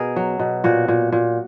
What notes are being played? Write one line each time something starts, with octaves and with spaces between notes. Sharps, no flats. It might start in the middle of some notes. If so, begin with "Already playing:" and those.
Already playing: B2 G#4 A#4
F#3
B2
A#2 F#4
A#2
A#2